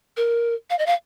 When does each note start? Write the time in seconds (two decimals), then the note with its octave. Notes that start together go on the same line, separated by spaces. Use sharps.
0.17 A#4
0.70 F5
0.79 D#5
0.86 F5